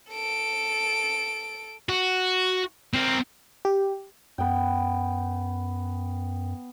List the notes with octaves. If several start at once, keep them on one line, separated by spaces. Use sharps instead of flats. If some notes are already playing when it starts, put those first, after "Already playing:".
A4 D7
F#4
C4 A#4
G4
F#2 B3 G5